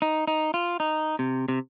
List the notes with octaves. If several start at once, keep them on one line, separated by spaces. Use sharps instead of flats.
D#4
D#4
F4
D#4
C3
C3